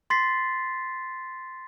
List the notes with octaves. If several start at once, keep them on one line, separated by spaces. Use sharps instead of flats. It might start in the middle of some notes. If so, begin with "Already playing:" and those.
C6 A6 B6 C7